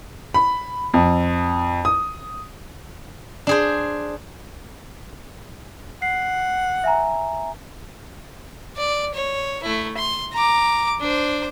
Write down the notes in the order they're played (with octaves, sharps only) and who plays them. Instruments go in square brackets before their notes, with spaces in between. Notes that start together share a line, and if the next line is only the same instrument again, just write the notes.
[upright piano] B5
F2
D#6
[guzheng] D4 G#4 C5
[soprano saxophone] F#5 [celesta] C7
[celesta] E5 G#5 A#5
[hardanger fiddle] D5
C#5
A3 E4
C6
A#5 D6
D4 C5